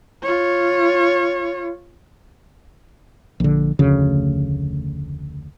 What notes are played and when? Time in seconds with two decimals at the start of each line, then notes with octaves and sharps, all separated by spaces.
0.23 F4 C#5
3.40 A#1 D3
3.79 F1 D2 C#3